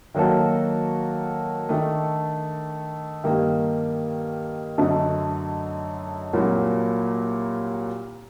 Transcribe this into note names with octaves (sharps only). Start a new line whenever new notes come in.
D#3 F#3 A#3 F#4 A4
D#3 A3 D4 A4
G2 D#3 G3 A#3
F#2 D3 A3 D#4
C2 A#2 F#3 A#3 F#4